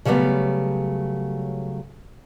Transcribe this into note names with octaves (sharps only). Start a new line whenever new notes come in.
C#3 F#3 G3 A3 B3